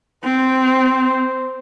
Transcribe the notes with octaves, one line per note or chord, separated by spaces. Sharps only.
C4 C5